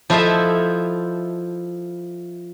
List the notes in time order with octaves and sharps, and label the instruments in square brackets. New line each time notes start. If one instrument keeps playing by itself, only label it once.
[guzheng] F3 E4 A4 C5 D#5 E5